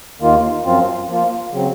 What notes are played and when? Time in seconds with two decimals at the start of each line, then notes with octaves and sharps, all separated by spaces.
0.20 D#2 D#3 A#3 F4
0.64 F#2 F3 C4 F4
1.08 F3 A#3 F4
1.52 C#3 F#3 C4